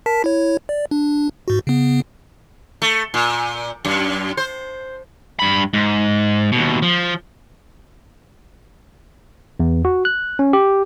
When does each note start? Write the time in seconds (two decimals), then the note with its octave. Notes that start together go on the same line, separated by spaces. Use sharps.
0.06 A#4 A5 B6
0.24 E4 C#5
0.69 D5
0.91 D4
1.48 G#2 F#4
1.67 C#3 B3
2.82 A3
3.14 A#2
3.85 F#2
4.37 C5
5.39 G2 B5
5.74 G#2
6.52 D#2 B2
6.82 F3
9.60 E2
9.85 F#4
10.05 F#6
10.39 C#4
10.53 G4